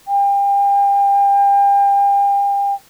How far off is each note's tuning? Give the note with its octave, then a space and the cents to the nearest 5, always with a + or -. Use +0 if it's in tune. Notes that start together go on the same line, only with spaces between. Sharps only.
G5 +35